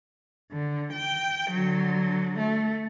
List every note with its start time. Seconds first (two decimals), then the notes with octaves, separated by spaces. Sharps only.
0.51 D3
0.92 G5
1.50 D3 F#3
2.38 A3